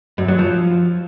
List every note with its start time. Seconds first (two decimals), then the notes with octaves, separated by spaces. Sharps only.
0.18 F#2
0.28 F#3
0.39 F3